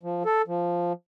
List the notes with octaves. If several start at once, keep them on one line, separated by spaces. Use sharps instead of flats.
F3
A4
F3